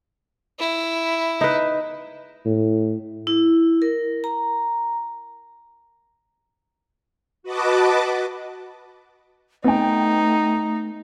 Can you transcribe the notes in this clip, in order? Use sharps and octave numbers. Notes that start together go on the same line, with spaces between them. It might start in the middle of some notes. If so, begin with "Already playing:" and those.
E4
D#4 B4
A2
E4
A#4
A#5
F#4 B4 D#5 A5 D6
A3 B3 D#4 G5